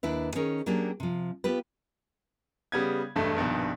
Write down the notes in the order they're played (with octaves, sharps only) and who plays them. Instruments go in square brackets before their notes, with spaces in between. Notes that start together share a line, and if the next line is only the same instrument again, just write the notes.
[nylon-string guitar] D#2 D4 E4 B4
D#3 C#4 G#4 A#4
F#3 A#3 C#4 D4 G4 G#4
C3 F3
B3 F4 G4 B4
[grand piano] C#3 G3 B3 G#6
E1 G2 A3
A#1 G2 B2 D#3